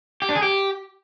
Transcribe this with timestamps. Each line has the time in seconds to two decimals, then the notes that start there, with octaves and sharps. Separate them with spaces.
0.22 G4
0.29 D4
0.36 G#4
0.42 G4